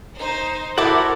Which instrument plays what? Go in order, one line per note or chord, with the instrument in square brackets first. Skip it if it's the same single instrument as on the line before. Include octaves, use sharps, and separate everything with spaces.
[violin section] D#4 C5
[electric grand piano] E4 F#4 C5 [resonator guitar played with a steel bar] A4 E5 [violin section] A#4 [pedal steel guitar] F#5 D6